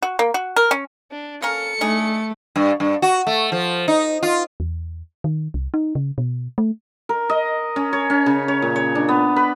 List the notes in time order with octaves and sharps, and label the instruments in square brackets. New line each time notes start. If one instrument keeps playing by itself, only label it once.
[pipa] F#4
A#3
F#4
A#4
C#4
[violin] D4
[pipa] A#3 C#4 A#4 [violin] A4 C#7
[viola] A3 [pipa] D4 D#4 G#4
[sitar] G2
G2
F#4
A3
F3
D#4
F4
[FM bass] E2
D#3
C2
D#4
C#3
B2
A3
[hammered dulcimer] A#4
D#5
C#4
C#5
C#4
C#3
C#5
A#2
C#5
D4
B3
B4